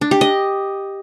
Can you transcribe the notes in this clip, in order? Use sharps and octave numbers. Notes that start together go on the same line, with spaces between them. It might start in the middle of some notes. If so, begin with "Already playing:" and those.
D4
G4
D#5